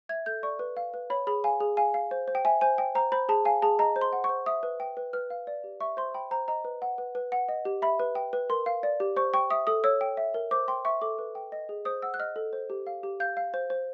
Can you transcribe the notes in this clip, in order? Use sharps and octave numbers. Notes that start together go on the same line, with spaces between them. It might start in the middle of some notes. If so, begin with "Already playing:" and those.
E5 G#6
A4 G6
D5 C#6
B4
F5
B4
C#5 B5
G#4 B5
F5 G#5
G#4
F5 G#5
F5
C5
C5
G5
E5 G#5
C5 G#5
G5
C5 A#5
C5 B5
G#4 A5
F5 G#5
G#4 A5
D#5 A#5
C5
C6
F#5
C#6
C5
E5 D#6
B4
G5
B4
B4 F6
F5
D5
G4
E5 C#6
C5 C6
G5 B5
C5 A#5
D#5 A#5
B4
F#5
B4
B4
F#5
D#5
G4
E5 B5
B4
G5
B4
A#4 C6
F5
D5
G4
C5 C#6
G5 C#6
E5 D#6
A4 D#6
C#5 E6
G5
E5
A#4
C5 D6
G5 C6
E5 C#6
A4 D6
B4
G5
D#5
G#4
C5 D#6
F#5 E6
F#6
D#5 F6
A4
C5
G4
F5
G4
F5 G6
F5
C5
C5